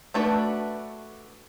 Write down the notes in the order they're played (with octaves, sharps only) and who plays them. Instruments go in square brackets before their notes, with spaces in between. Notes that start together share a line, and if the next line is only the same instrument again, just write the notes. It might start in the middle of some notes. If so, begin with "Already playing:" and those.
[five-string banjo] A3 D4 F#4 B4